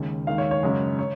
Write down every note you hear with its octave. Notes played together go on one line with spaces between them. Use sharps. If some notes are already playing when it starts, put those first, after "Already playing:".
Already playing: D#2 C#3 G#3
D#2 D#3 G#3 F5
C#5
C#5
F#2 C#3 G#3
C#5